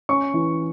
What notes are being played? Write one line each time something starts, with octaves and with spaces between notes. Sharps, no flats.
C#4 C#6
E3